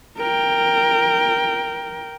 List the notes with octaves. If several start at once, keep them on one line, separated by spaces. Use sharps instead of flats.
A#4 G5